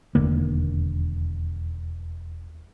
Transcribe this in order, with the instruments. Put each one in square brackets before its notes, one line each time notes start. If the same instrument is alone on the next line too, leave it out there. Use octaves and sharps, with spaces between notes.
[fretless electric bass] E1 D#2 D3 A#3